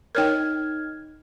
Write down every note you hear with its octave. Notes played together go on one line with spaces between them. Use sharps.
D#4 A#4 C#5 G5 F6 G#6